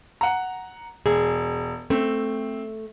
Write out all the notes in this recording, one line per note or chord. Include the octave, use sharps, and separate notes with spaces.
F#5 A#5
E1 G#4
A3 C4